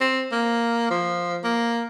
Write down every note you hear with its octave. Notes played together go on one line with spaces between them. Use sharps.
C4
A#3
F3
A#3